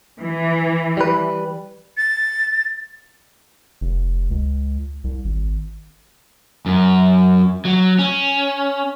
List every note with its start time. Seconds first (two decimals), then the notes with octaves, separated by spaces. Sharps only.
0.20 E3
0.97 G3 B4
1.97 A6
3.81 F1
4.31 C#2
5.04 C2
5.25 G#1
6.66 F#2
7.65 F#3
7.99 C#4